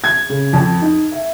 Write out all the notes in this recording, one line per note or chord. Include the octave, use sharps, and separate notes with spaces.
G#6
C#3
F2
D#4
E5